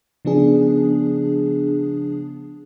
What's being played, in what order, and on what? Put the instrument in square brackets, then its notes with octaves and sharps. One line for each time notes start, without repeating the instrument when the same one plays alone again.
[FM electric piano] C#3 F3 B3 D4 G#4